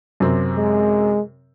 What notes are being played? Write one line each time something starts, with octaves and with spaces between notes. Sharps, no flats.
F#2 C3 C4
G#3